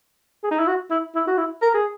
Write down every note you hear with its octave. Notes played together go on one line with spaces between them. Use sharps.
G#4
D#4
E4
F#4
E4
E4
F#4
E4
A#4
G#4